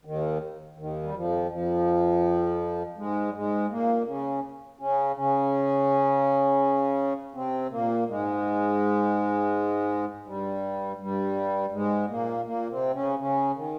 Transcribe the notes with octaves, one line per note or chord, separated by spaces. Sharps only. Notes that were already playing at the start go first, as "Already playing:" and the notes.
D#2 D#3
D#2 D#3
G3
F2 F3
F2 F3
G#2 G#3
G3
G#2 G#3
A#2 A#3
C#3 C#4
C#3 C#4
C#3 C#4
C3 C4
A#2 A#3
G#2 G#3
G2 G3
G2 G3
G#2 G#3
A#2 A#3
A#2 A#3
C3 C4
C#3 C#4
C#3 C#4
D#3